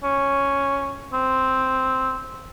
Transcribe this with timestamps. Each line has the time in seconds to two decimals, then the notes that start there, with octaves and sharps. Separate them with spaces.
0.04 C#4
1.13 C4